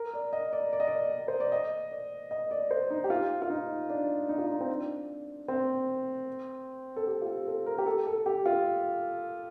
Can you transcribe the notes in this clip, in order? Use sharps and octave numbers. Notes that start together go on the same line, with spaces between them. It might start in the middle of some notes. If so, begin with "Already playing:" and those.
Already playing: A#4
D5
D#5
D5
D5
D#5
D5
C5
D5
D#5
D5
D#5
D5
C5
D#4
G4
F4
F4
D#4
D4
D#4
F4
D#4
C4
D4
C4
A4
G4
F4
G4
A4
A#4
G4
A4
A4
G4
F4